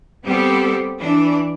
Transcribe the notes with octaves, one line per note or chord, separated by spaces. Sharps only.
G3 B3 C4 G4 A4
E3 D4